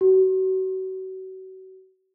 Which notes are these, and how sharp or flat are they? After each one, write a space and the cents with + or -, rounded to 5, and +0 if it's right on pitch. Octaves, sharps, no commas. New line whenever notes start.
F#4 +35